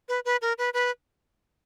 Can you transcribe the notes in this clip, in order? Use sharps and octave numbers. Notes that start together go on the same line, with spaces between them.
B4
B4
A#4
B4
B4